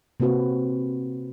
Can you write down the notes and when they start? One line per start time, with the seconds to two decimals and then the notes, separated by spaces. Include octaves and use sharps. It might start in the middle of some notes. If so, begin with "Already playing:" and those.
0.20 C3 A#3 C4 F#4 B4